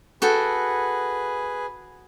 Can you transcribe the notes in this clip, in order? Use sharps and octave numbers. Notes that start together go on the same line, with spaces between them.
F#4 G#4 A4 B4 G5